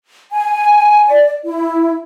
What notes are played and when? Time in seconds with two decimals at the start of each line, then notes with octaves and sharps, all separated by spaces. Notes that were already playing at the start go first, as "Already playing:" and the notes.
0.31 G#5
1.07 D5
1.45 E4